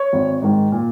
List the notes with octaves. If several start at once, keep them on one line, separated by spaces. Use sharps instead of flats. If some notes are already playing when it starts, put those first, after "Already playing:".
Already playing: C#5
G#1
G#2 D#3
A#2